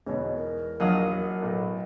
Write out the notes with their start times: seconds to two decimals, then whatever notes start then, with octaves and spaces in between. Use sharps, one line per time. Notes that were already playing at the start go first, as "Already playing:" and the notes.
0.06 E2 G#2 B2 C#5
0.36 A#4
0.80 A#1 F#3 D#5 F5 F#5 D#6
1.42 B1 A2